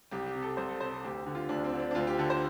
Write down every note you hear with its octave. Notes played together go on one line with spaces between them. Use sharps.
C2 G4
G4
C3
A4
C2 C5
A4
C3 C5
A4
D2 G4
D3
F4
D2 D4
C4
D3
D4
D4
D2 F4
G4
D3 A4
C5